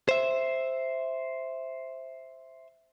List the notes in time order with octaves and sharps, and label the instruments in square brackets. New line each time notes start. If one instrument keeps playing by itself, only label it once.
[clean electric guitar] C5 E5